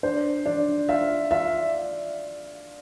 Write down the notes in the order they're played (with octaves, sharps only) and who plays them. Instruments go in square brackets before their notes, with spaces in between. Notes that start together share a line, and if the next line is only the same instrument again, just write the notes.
[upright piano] D4 [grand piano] C5
[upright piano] D4
[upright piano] F4 [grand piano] E5
[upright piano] F4 [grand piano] E5